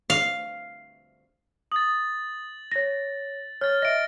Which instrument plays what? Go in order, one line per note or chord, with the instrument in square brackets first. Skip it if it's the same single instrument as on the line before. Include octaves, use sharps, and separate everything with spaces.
[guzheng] F5
[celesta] D#6 [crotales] A6 F#7
[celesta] C#5 A#6
[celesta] C#5 [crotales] F6 A6
[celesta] D#5 E5 [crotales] A#6 D7